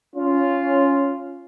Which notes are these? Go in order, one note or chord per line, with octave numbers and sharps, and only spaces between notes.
C#4 F4